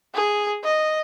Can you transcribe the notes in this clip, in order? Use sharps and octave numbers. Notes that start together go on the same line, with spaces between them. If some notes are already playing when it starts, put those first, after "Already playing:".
G#4
D#5